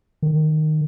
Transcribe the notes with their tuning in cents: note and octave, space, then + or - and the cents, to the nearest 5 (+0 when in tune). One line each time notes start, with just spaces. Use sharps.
D#3 -10